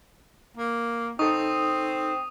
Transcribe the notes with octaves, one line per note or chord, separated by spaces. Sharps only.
A#3
C4 D#4 A4 C#6 D#6